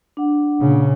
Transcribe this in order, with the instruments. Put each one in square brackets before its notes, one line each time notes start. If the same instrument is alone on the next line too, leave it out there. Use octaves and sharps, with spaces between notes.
[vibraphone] D4 F#5
[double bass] A#2 C#3